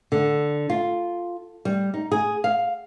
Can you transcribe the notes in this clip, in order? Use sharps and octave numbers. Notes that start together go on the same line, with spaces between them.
D3
F4
G3
D#4
G#4
F5